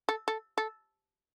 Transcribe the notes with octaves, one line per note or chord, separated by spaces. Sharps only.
A4
A4
A4